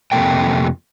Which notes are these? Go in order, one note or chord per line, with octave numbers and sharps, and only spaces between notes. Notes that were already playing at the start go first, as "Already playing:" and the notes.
F2 C3 E3 A#3 A4 G5